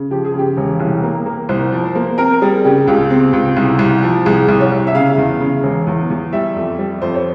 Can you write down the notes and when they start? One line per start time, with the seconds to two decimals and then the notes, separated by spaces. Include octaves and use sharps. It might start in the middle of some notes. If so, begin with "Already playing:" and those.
Already playing: C#3
0.11 F3 G4
0.25 G#4
0.34 C#3 G4
0.57 E1
0.80 C2
1.03 A#3
1.26 A#3
1.49 C2 C5
1.72 F3
1.84 C5
1.95 A#3
2.18 C4 A#4
2.41 G3 G#4
2.65 C#3 G4
2.87 C#2 G4
3.10 C4
3.33 C#2
3.57 C2
3.79 C2
4.03 F3
4.25 C2 G#4
4.48 C2
4.60 C#5
4.72 C2
4.87 E5
4.95 C#3 F5
5.18 E2
5.41 C#3
5.63 E1
5.87 E2
6.10 E2
6.33 G3 E5
6.56 F2
6.79 G3
7.02 F2 C5
7.15 C#5